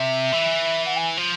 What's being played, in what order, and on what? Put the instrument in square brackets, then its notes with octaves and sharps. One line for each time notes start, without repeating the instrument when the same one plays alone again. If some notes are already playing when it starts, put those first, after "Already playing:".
Already playing: [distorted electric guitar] C3 [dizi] E5
[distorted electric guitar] E3
[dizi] F#5
G#5
[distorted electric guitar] F3